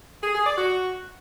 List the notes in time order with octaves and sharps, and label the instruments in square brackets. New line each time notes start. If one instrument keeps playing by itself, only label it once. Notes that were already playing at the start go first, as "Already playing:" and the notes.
[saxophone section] G#4
G#4
D5
F#4